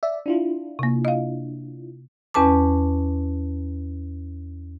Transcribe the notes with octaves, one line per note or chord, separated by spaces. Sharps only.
D5 E5
D4 E4 F4
C3 A#3
D#5 F5
E2 C#4 B4 A5 D6